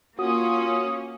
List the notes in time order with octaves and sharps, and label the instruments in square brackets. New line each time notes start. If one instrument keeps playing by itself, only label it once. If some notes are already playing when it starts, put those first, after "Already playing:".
[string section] A#3 C#4 [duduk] F4 [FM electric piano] F#4 [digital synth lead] D#6